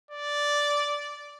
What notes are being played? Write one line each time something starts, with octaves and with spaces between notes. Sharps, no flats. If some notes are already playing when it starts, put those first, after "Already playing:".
D5